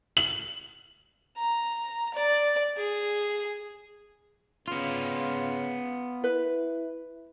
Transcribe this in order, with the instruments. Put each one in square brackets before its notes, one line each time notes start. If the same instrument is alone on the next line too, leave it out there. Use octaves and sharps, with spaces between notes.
[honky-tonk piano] F#7
[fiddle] A#5
D5
G#4
[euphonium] C#3 [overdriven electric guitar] B3 F4
[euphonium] E4 [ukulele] B4